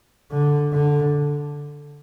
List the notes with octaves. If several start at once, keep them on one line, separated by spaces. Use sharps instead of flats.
D3
D3